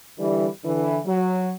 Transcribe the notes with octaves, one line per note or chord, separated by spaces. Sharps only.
D3 E3 G3
D3 E3
F#3